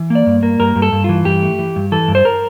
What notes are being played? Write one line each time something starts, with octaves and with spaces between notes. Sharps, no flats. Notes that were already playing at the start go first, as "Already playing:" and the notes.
Already playing: E3
A#3
D5
G2
A#3
G2 A#4
G2
A4
G2
E3 F4
G2 G4
A3
E3
G2
E3 A4
G2
C5
A#4